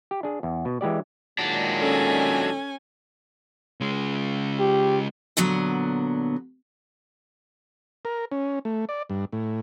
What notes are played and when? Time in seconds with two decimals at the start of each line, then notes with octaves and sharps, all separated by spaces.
0.11 G4
0.23 D4 G#4
0.43 E2
0.65 B2
0.81 E3 G#3 G4 D5
1.39 A#2 D#3 F#3 G#3 D4
1.79 C#4 A4 G#5
3.81 C#3 G#3
4.59 G4
5.37 A#2 D3 F#3 B3
8.05 A#4
8.32 C#4
8.65 A3
8.89 D5
9.10 G2
9.32 A2